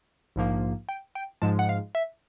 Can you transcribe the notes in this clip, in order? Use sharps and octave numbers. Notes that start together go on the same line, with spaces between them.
A#1 G#2 F3 A#3
G5
G5
G#2 F3 G#3 A5
F#5
F5
E5